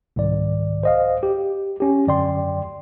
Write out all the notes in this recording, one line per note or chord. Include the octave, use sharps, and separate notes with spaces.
C2 G#2 D#3 D5
C5 D#5 F5
G4
C#4 G4
F#2 D3 D5 G5 C6